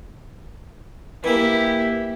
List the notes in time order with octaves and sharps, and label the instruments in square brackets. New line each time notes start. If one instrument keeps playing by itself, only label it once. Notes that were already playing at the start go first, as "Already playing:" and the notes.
[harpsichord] E3 A#3 [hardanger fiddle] E4 G4